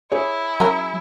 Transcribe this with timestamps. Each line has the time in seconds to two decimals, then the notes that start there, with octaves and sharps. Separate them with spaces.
0.12 E4 G#4 C#5
0.60 F#3 C#4 A#4